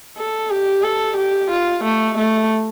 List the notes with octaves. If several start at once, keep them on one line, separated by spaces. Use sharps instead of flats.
A4
G4
A4
G4
F4
A3
A3